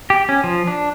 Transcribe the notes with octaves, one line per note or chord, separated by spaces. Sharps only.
G4
C#4
F3
D4